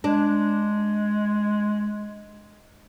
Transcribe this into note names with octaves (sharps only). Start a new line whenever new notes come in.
G#3 D4